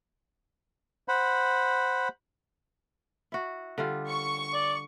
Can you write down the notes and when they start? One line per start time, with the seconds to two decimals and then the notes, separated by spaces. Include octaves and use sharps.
1.08 C5 F#5 B5
3.32 E4 F#4
3.78 D3 G3 F4
4.08 C#6
4.54 D5